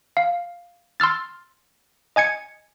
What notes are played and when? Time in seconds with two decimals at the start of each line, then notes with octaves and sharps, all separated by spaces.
0.17 F5
1.00 C6 E6 F6 A6
2.16 D#5 G#5 G#6 C#7